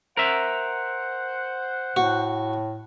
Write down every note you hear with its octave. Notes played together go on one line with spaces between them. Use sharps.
A#4 C5 E5 F#5
A2 F#4